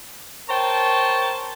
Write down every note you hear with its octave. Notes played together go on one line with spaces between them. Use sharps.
A#4 C5 C#5 G5 A5 A#5